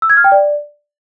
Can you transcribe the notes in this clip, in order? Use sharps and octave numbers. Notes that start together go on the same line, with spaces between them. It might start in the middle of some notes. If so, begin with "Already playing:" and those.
E6
G#6
F6
G5
D5